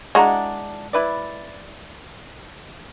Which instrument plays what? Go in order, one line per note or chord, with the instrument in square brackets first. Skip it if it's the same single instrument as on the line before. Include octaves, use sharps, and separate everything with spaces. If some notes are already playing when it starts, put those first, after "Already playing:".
[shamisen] G#3 F#4 [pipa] D4 E4 A#5
[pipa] E4 B4 D5